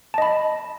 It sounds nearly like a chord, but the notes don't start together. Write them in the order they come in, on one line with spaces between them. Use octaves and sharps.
A5 D#5 B5